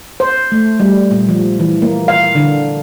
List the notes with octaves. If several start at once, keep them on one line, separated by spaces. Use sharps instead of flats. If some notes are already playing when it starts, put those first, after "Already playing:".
C5
A3
G3
A#2
F3
E3
A#3
F5
D3